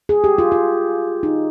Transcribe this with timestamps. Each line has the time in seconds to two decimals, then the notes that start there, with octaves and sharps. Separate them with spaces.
0.09 G#4
0.24 G4
0.38 F4
0.52 F4
1.23 D#4